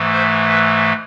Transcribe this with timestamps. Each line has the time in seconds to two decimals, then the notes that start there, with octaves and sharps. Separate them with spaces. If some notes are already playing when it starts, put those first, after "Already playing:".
Already playing: G#2 E3 A3
0.11 C5
0.48 B4